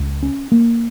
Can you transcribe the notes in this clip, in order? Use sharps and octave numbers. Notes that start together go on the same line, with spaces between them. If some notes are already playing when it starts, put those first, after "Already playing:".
Already playing: C#2
C#4
A#3